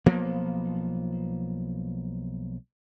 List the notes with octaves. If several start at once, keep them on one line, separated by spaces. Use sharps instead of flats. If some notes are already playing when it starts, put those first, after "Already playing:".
B1 F3 A#3 B3